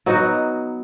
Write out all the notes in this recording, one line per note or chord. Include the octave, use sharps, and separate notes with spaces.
F#3 B3 D#4 F#4